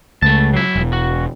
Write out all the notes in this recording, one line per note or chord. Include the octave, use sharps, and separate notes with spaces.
C#2 A3 A5
F#3 E4
E1
F#4